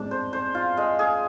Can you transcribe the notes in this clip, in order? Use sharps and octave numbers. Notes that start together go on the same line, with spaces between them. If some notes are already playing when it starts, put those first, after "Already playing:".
Already playing: G#3 C4 D4
C5
C5
F4
G#3
G#4